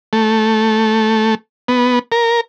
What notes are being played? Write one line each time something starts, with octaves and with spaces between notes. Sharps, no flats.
A3
B3
A#4